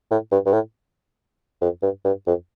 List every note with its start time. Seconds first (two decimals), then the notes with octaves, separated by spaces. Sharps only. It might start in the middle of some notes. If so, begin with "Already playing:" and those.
0.11 A2
0.31 G2
0.46 G2
0.53 A2
1.62 F2
1.82 G2
2.05 G2
2.27 F2